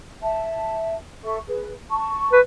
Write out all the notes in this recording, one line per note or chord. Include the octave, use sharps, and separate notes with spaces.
E5 A5
A4 E5 C#6
G#4 B4
A5 C#6
B4